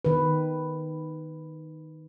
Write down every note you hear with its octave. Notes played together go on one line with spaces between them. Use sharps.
D#3 B4